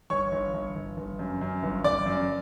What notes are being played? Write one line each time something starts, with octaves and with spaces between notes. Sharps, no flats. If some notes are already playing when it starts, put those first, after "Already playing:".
G1 C#5 C#6
G1
G1
G1
G1
F#2
F#2
G1
G1 D5 D6
F#2